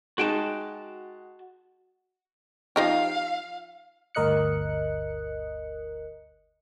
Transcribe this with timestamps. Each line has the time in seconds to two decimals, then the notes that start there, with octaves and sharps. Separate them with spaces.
0.18 G#3 D#4 F#4 G5 A5
2.76 F3 D#4 G4 F5
4.15 G1 D2 A#4 D#5 F#6 C#7